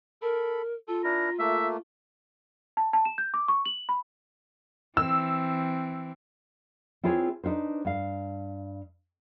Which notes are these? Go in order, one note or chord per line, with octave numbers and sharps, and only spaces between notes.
A4 A#4 B5
F4 A4
D4 E4 A#4 A#5
A3 A#3 E5
A5
A5
E7
G6
D6
C#6
F#7
B5
E3 C4 E6
C4 E4 F4 G#4 B4 C#5
D4 D#4 F4 B4 C5
G2 F5